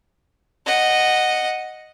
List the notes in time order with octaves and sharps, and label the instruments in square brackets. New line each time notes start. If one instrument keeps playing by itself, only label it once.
[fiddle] D#5 F#5